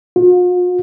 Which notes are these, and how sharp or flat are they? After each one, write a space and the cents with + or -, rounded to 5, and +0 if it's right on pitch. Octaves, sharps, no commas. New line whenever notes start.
F4 +45